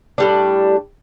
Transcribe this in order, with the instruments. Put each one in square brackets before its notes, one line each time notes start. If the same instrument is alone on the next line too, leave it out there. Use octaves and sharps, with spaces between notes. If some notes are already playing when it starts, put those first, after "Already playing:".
[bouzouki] A2 G3 D4